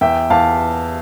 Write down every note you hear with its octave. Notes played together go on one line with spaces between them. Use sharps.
E2 E5 G5
E2 F5 A5